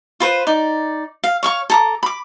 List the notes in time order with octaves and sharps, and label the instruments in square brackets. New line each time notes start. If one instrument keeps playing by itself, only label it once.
[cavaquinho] F4 B4 C5
D#4 D5
F5
C#5 F5 C#6
A4 A#5 D6
B5 D6